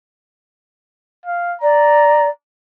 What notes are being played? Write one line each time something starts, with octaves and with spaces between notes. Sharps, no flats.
F5
D5 A#5